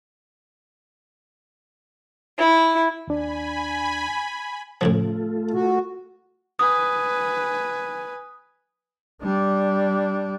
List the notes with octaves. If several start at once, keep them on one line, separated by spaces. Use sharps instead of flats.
E4
D#2 D4 G#5 B5
A2 C#3 F3 A3 F4 A4
F#4
B4 G#5 D#6
G3 D4